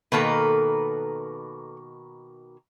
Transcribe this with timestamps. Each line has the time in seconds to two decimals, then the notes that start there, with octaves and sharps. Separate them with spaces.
0.12 B2 D#3 A#3 A4 B4